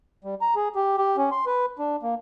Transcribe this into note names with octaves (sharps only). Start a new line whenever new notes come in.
G3
A#5
G#4
G4
G4
C#4
C6
B4
D4
A#3